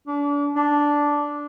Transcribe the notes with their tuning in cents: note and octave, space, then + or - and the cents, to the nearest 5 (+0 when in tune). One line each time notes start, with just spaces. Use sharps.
D4 -35
D4 -5